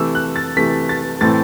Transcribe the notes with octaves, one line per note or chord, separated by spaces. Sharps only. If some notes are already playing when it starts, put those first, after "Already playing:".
Already playing: C3 E3 A3 E6
F#6
A6
C3 E3 A3 B6
A6
A2 E3 A3 C4 A6